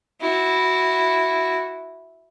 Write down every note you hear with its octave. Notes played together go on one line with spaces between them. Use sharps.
E4 F#4